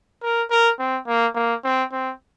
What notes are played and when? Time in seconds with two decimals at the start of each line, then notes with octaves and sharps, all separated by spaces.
0.23 A#4
0.51 A#4
0.79 C4
1.07 A#3
1.35 A#3
1.64 C4
1.92 C4